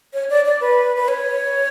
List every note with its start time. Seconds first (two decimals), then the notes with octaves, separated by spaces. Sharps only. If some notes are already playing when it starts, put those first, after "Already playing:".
0.14 C#5
0.30 D5
0.46 D5
0.61 B4
0.96 B4
1.08 C#5